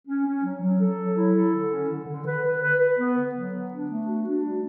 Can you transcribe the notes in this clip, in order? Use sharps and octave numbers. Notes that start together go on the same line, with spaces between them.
C#4
C#4
F#3
F#3
A4
F#3
E4
A4
D3
C#4
D3
D3
B4
B4
B4
B4
B3
D3
F#3
B3
D4
A3
F#4
D4
G3